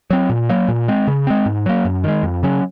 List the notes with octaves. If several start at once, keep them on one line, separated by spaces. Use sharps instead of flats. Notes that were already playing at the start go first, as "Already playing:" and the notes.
F#3 C4
A#2
F#3 A#3
A#2
G#3 C4
C#3
G#3 C4
G#2
F#3 A#3
F#2
D#3 G#3
F2
C#3 F#3 C#4